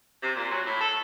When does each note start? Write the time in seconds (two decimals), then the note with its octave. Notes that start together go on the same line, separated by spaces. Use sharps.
0.23 C3
0.36 A#2
0.51 F#3
0.66 A2
0.81 A4